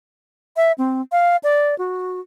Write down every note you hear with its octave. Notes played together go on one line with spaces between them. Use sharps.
E5
C4
F5
D5
F#4